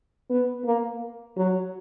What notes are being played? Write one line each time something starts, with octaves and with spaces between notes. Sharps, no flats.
B3
A#3
F#3